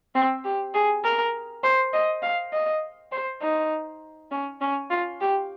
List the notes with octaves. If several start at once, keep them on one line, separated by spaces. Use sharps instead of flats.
C4
G4
G#4
A#4
C5
D#5
F5
D#5
C5
D#4
C#4
C#4
F4
G4